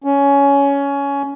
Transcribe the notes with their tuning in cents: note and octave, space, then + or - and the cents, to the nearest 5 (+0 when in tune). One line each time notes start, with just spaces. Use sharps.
C#4 +15